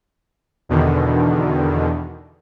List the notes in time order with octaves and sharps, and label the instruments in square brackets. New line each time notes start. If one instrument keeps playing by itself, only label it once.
[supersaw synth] E2 B2 D3 D#3